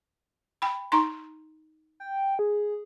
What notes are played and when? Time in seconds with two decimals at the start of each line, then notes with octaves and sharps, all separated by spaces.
0.62 G5 B5
0.92 D#4 A#5 C6
2.00 G5
2.39 G#4